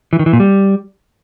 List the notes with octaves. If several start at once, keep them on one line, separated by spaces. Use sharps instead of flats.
E3
D#3
E3
A#2
G3